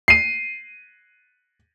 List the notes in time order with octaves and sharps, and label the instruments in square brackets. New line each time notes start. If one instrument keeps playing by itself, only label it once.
[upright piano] C7 D#7